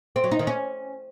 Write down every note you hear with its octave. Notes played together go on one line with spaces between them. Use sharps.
C4
F#3
D#4
D#3
C#4